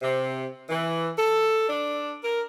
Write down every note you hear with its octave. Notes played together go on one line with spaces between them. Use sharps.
C3
E3
A4
D4
A#4